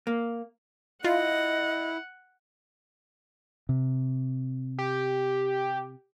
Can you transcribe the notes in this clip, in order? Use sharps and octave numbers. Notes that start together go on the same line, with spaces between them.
A#3
E4 F4 D#5 F#5
C3
G4